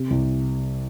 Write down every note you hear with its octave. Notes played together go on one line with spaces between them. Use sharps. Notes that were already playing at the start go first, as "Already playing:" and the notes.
Already playing: C3
C2